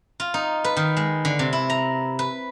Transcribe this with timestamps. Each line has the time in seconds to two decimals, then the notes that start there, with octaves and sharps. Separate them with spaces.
0.20 F4
0.34 D#4
0.64 B4
0.77 D#3
0.97 G#3
1.25 D3
1.39 C3
1.53 E4
1.70 A#5
2.19 B4